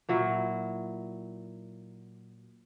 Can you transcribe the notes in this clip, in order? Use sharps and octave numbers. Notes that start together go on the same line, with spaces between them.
A#2 F#3 E4